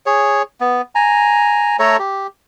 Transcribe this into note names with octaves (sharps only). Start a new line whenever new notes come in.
G#4 C#5
B3
G#5 A#5
A3 A4 C#5 A#5
G4